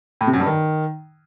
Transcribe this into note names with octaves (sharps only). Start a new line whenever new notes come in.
A2
C3
F#2
G2
D#3